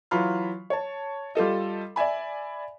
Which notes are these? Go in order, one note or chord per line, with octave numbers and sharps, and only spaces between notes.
E3 F#3 F4 B5 F6
C#5 A5
G3 F4 A4 D#5
D5 E5 G#5 B5